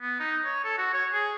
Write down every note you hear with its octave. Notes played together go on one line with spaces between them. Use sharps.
B3
D#4
C#5
A4
F#4
C#5
G#4